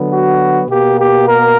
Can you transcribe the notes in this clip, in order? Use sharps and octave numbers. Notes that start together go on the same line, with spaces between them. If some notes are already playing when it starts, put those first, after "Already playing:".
Already playing: D3 F#3 B3
F#4
B2 A#3 G4
G4
A#4